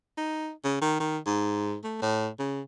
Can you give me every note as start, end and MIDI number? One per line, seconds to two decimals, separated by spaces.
0.18 0.51 63
0.65 0.78 49
0.82 0.96 51
1.00 1.18 51
1.27 1.76 44
1.84 1.98 57
2.02 2.29 45
2.39 2.62 49